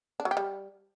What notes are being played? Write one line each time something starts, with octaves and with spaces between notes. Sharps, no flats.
D4
F#3
G4
G3